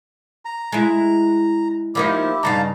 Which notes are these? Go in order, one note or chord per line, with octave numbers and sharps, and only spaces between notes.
A#5
G#3 E4
F3 A#3 D#4 E4 G4
G2 C#3 D#4 F5 A5 A#5